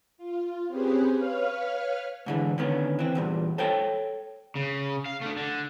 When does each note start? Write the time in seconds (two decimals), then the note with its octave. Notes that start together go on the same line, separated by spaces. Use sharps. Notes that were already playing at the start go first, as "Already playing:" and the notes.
0.18 F4
0.68 C4 C#4 G4 G#4 B4 C5
1.14 B4 C#5 F5 F6
2.26 G#2 D3 E3
2.58 D3 D#3 B3 C#4
2.99 E3 C4
3.15 E2 G2 A#2
3.58 A4 C5 C#5 G5
4.55 C#3
5.06 F5
5.22 A3 D4
5.37 D3